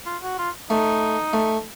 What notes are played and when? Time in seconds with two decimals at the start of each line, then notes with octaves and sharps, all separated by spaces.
0.06 F4
0.22 F#4
0.38 F4
0.70 A3 D#4
1.33 A3